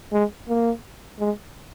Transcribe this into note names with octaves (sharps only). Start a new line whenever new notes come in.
G#3
A#3
G#3